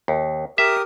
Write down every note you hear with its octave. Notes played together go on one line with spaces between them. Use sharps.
D#2
G4 A#4 E5 D#6